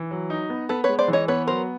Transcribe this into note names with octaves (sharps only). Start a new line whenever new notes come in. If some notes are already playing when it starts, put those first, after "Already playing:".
Already playing: E3
F#3
D#4
B3
B3 A4 B4
G#3 B4 C#5
C5 D5
E3
C#5 D#5
B3 B4 C#5
F#3 A#4 C5